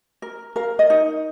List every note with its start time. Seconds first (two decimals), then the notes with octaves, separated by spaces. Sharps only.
0.22 A#4
0.56 A#4 F5
0.79 D#5
0.90 D#4